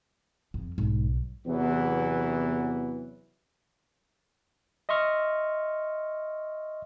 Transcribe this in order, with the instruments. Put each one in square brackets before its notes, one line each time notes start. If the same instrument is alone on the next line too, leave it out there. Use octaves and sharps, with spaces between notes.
[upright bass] F2
[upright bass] B1 [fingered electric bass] G#2
[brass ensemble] E2 C3 E3 F#3 B3
[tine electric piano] D#5 E5 C6 C#6 F6